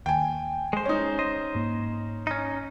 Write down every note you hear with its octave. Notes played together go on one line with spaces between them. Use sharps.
D#2 G5 G#5
G#3 C5
C#4 D#4
C5 D#5
G#2 A#3
C#4 D#4